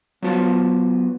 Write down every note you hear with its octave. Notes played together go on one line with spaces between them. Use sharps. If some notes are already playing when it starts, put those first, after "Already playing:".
F#3 B3 F4 F#4 C5 A5